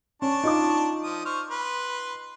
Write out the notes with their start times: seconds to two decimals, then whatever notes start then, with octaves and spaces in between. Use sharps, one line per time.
0.22 C#4 D4 A5 C#6
0.44 D#4 F4 D6
1.03 F3 D#6
1.25 C5 C#6 F6
1.51 B4 C6